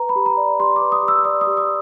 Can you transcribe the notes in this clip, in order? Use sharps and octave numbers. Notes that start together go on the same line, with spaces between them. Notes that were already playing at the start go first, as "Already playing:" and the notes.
Already playing: B4 A#5
B5
G4
A#5
D5
G4 C6
B4 D6
D#6
G4
E6
D5 D#6
D#6
G4
D#6